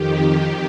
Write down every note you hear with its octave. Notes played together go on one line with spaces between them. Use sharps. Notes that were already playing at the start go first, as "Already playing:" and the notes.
Already playing: F2 D#3 G4